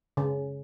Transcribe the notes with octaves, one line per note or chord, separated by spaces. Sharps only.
C#3